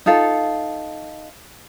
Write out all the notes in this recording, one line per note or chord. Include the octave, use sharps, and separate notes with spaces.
D#4 F4 A4 F5